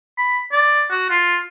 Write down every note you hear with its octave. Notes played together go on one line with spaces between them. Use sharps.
B5
D5
F#4
F4